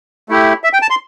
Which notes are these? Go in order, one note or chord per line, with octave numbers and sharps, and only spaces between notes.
A3 E4 G4
E5
G5
A5
C6